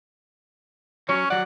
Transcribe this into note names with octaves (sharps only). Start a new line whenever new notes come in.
F#3 C#4 C#5
F#3 D5 F#5